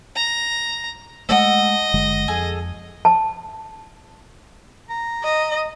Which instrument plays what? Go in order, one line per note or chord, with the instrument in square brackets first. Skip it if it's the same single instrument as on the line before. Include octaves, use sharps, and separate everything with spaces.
[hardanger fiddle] A#5
[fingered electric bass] G#3 A3 [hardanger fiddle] D#5 [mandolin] F#5 A5 E6
[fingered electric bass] F#1 D3 G#3
[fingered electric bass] F2 [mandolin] G#4 A4 G#5
[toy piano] A5
[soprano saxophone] A#5
[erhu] D#5